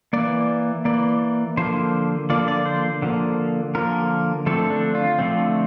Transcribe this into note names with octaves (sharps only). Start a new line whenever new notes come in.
E3 A#3 D5
E3 A#3 D5
D3 F3 A#3 C5
D3 F3 A#3 D5
D5
C5
D3 F3 A#3
D3 F3 A#3 A#4
D3 F3 A3 C4 A4
D4
F4
D3 F3 A3 C4